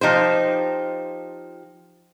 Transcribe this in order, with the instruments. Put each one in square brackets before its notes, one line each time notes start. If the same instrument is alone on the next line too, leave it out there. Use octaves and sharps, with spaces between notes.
[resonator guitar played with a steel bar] F3 D#4 G4 C5